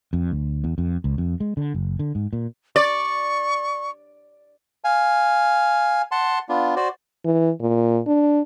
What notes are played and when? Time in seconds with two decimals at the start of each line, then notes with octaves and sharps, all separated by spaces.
0.13 F2
0.32 D2
0.64 E2
0.78 F2
1.04 C#2
1.18 F2
1.40 G#3
1.57 D3
1.74 F#1
1.99 D3
2.15 G#2
2.33 A#2
2.76 D5 C#6
4.84 F5 G#5
6.12 F#5 A5 C6
6.49 B3 D4 F4
6.76 F#4 C5 D5
7.25 E3
7.61 A#2
8.07 D4